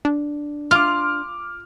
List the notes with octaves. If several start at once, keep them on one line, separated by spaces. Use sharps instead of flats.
D4
F4 D6 F6